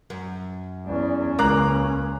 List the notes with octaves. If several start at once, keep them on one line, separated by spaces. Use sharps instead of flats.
F#2
E2 C#4 D4
C#2 A#3 A#5 D6 F#6